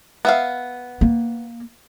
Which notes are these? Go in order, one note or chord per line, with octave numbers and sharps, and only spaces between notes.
B3 E5 F5
A#3